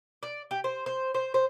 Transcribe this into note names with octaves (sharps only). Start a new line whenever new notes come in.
D5
G4
C5
C5
C5
C5